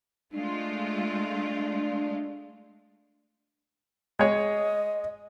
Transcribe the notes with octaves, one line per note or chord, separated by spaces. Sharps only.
G#3 A3 D4 F4
G#3 C#5 D#5